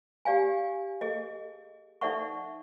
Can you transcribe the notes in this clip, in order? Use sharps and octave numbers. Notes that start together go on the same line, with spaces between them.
G4 D5 F5 G#5
G#4 A4 D#5
D#4 A4 D5 E5 F#5 C#6